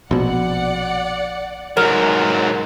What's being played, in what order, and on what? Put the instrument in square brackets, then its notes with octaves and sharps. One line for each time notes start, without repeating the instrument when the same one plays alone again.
[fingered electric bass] A#1 B2 [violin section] D5 F#5
[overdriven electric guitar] G#2 F#3 [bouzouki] A#4